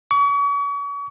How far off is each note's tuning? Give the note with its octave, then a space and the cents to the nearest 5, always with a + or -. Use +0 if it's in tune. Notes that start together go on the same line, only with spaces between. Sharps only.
C#6 +40